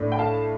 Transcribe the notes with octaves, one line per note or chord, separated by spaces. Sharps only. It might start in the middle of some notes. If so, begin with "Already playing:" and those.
Already playing: A2 A3 D4
G5
F5 A5